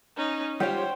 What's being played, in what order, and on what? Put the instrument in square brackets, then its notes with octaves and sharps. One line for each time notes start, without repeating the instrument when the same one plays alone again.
[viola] C#4 D#4
[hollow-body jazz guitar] G3 F4 G4 [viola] C5 [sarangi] C#5 [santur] G5